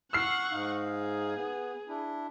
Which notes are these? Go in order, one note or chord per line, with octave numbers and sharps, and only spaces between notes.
F#5 C#6 E6 F6 C7
G#2 D#4 F5
G#4
B3
D4 E4